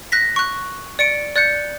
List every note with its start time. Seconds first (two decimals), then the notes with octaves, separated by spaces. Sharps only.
0.12 F#6 A#6 B6
0.36 C#6 F#6
0.99 D5 C#7 D7
1.36 D5 F#6 G6 C#7